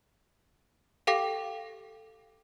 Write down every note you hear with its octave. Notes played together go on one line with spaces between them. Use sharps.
G4 A4 F5 G5 D6 A#6